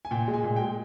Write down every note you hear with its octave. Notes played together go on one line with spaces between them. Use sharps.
G#5
A#2 G5
G#3
G#5
A#2
G5
G#3